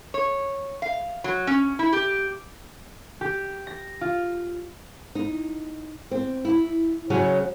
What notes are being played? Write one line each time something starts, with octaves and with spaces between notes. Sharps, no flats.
C#5
F5
F#3
C#4
E4
G4
G4
A#6
F4
D#4
C4
E4
C#3 F#3 C#4 G#5